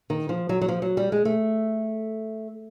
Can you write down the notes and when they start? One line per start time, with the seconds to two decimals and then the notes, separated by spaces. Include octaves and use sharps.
0.10 D#3
0.29 F3
0.49 F#3
0.61 F#3
0.68 F3
0.82 F#3
0.97 G3
1.12 G#3
1.25 A3